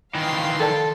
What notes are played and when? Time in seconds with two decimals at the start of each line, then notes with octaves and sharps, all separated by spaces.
0.15 D#3 E3 F5 G5 C6
0.60 A4 A#4 D5 A5